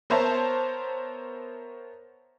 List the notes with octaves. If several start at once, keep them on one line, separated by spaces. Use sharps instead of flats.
B3 A#4 C5 C#5 E5 A5